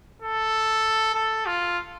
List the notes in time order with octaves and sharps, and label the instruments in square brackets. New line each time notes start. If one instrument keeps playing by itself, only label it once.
[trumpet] A4
A4
F4